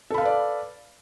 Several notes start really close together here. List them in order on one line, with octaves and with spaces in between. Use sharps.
A4 B5 F5 B4 D5